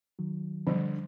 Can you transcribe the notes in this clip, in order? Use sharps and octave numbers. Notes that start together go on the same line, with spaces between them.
D#3 F#3
D3 F3 G3